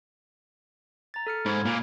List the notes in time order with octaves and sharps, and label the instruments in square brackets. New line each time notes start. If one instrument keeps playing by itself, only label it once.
[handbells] A#5 A6
A4 F6 C#7
[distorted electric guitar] G#2 [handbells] B5 G#6
[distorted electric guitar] A#2